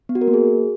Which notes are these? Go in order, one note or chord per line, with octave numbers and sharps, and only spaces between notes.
B3
F#4
A#4
A#3
G#4